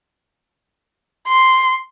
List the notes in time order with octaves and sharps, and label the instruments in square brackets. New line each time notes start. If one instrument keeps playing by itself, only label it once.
[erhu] C6